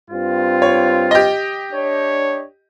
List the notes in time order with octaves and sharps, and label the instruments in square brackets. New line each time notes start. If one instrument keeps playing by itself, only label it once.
[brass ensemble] G2 C4 F4
[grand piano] C#5
G4 D#5
[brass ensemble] D4 C#5